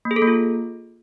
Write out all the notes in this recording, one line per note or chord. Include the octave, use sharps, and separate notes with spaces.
A#3
G#4
A4
A#3
F4